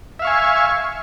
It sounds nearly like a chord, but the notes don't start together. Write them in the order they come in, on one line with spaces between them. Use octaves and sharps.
E5 F5 C#6 G#5